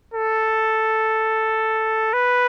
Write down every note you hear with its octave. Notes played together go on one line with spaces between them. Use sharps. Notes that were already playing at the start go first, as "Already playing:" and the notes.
A4
B4